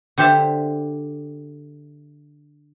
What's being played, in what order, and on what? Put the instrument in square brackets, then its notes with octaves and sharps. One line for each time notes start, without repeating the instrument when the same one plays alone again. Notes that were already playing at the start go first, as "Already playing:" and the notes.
[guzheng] D3 G4 C5 E5 A5